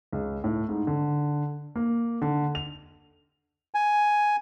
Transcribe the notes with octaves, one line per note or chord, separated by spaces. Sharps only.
C#2
A2
G#2
D3
A#3
D3
F7
G#5